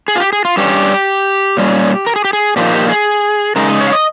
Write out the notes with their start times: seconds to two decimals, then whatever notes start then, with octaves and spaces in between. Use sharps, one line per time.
0.08 G#4
0.15 F4
0.20 G4
0.33 G#4
0.45 F4
0.57 G2 G3 C#4 G4
1.57 A#2 G3 C#4
2.07 A#4
2.16 G#4
2.25 G4
2.33 G#4
2.56 A#2 F3 A#3 D#4 G4
2.73 G4
2.89 G#4
3.56 C#3 G#3 D#4 A#4
3.68 D#5
3.81 C#5
3.87 F5
3.93 D#5